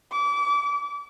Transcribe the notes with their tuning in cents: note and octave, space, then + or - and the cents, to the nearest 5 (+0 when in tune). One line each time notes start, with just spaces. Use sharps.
D6 -30